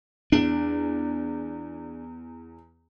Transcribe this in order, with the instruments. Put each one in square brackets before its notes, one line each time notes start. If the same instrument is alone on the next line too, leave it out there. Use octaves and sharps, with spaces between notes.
[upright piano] E2 [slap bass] D4